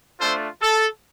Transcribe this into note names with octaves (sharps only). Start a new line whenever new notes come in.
A3 D4 F4 A4 C5
A4